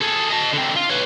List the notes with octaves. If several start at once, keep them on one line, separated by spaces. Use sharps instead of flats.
G#4 A4
D#5 A5
D3 C4
F4
B4 C#5